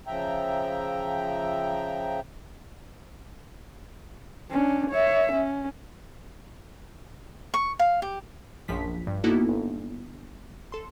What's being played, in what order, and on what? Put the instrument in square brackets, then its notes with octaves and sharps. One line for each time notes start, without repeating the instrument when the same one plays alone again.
[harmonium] C#3 F3 E5 G5 A#5
[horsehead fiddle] C#4 D4
C#5 E5
C#4
[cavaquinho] C#6
F5
G4
[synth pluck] A#1 F#2 F3 B6
G2
A#3 B3 D#4 E4 F#4 A4
G1
A4 C6